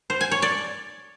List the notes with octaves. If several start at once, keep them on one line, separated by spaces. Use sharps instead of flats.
C5
G#5
C#5
D5